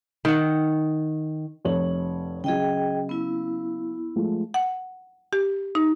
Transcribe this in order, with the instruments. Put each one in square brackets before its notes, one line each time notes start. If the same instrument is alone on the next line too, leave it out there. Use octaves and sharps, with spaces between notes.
[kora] D#3 F#5
[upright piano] F1 C#5 F#7
[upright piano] C#3 F#3 [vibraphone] G#4 D#5 G5
[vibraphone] B3 E4
[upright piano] F3 G#3 A3
[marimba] F#5
G4
D#4